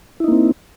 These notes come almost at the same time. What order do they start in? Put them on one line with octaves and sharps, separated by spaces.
E4 D#4 A#3 C4